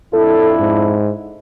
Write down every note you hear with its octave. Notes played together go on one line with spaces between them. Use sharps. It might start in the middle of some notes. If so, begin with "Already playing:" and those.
F2 D4 E4 A4
G#2